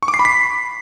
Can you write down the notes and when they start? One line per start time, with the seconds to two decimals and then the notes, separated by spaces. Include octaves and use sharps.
0.03 C#6
0.08 D6
0.14 C7
0.19 B5
0.25 B6